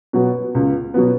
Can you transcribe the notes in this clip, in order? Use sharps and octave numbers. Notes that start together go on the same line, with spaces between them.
B2 F#3 B3
C#2
B2 F#3 B3